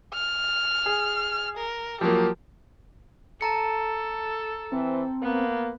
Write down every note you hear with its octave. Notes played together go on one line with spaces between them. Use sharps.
F6
G#4
A#4
F3 F#3 A#3 G4
A4 A5 A#5 C#7
E3 C4
A#3 B3